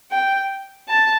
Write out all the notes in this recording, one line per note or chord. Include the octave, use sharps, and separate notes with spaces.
G5
A5